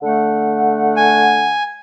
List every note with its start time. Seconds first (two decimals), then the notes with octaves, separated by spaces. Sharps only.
0.02 D3 A3 F#5
0.97 G#5